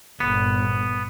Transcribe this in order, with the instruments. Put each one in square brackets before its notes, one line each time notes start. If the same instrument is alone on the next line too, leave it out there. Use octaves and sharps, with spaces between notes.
[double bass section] G1 A#2 [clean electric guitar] B3